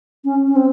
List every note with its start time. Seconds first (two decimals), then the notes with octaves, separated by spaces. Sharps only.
0.24 C#4
0.47 C#4
0.56 C4